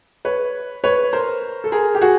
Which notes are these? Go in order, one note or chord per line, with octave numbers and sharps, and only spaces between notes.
B4 C#5
B4 C#5
A#4 C5
A4
G#4 A#4
G4
F#4 G#4